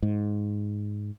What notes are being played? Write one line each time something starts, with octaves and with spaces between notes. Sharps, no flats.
G#2